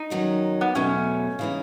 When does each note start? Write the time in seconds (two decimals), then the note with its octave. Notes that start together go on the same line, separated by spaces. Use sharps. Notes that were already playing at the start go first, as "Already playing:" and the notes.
Already playing: D#4
0.10 E2 D#3 F#3 C#4
0.61 B3
0.75 E2 B2 F#3 A3 C#4
1.39 C#3 E3 G#3 D#4